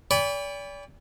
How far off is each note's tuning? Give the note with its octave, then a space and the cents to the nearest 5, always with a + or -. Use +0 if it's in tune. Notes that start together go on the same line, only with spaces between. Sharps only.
D5 -35 G5 +45 B5 +0